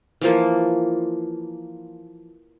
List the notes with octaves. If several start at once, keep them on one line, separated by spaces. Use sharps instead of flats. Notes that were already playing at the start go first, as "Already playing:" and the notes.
E3 F3 A#3